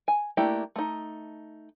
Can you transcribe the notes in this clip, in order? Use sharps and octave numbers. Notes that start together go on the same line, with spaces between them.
G#5
A3 A#3 D4 E4 G4
A3 D#4